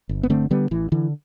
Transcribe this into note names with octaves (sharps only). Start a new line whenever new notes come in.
G1
B3
D3 A3 C4
D3 G3 B3
A1 E3
D3 E3